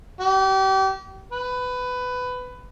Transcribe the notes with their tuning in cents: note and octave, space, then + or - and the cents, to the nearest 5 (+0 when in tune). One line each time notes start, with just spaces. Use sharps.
G4 -35
B4 +15